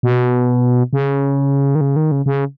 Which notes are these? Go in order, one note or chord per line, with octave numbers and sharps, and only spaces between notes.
B2
C#3
D#3
C#3
D#3
C#3
C#3